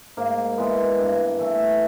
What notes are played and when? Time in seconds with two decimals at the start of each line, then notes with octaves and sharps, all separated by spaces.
0.17 G#2 A#3
0.57 E3 G#3 B3
0.98 G2
1.39 E3 A3